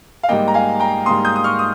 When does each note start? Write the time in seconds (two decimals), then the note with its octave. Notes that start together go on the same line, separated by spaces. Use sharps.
0.23 F5
0.29 G#2 G3 A#3 D#5 G5
0.48 A#5
0.54 F5 G#5
0.80 G5 A#5
1.06 G#2 G3 A#3 C6 D#6
1.25 D#6 G6
1.36 D#6
1.44 C#6 F6
1.59 D#6